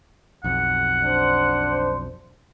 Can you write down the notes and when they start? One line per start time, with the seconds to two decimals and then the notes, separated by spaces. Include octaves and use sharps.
0.44 B1 F2 F#5
1.04 D4 C5